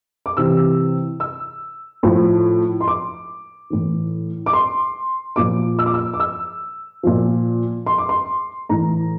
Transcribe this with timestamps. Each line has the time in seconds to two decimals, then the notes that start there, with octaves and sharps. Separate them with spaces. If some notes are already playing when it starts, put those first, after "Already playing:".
0.26 D6
0.37 C3 E3 E6
1.20 E6
2.03 A2 F3
2.81 C6
2.87 D6
3.70 A2 E3
4.46 D6
4.53 C6
5.36 A#2 F3 D6
5.79 E6
5.86 D6
5.94 E6
6.14 D6
6.20 E6
7.03 A#2 F3
7.86 C6
7.98 D6
8.09 C6
8.69 A2 E3 A#5